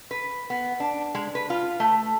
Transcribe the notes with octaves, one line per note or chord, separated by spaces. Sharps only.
B4
B3
D4
G#3
B4
F4
A3